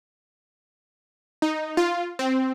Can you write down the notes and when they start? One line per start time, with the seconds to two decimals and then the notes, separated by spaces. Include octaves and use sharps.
1.42 D#4
1.77 F4
2.19 C4